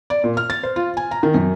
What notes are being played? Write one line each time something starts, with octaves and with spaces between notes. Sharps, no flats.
D5
A#2
F6
A6
C5
F4
G#5
A#5
D#3
F#2